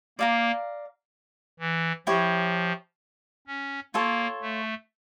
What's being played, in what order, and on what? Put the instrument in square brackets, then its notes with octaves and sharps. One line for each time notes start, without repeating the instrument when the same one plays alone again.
[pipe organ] A#3 [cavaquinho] D5 F5 A#5
[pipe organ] E3
[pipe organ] F3 [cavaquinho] E4 G4 C#5
[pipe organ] C#4
[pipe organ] A#3 [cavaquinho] F4 A4 C#5
[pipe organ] A3